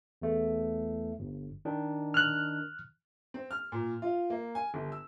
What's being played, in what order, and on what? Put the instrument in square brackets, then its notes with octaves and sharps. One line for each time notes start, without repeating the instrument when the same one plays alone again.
[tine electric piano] E2 A3
G1
D#3 D4
[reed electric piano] F6 F#6
[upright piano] C4
F6
A#2
F4
A#3
G#5
G1
E6